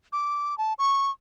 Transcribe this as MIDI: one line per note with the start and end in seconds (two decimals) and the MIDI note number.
0.13 0.57 86
0.58 0.74 81
0.79 1.11 85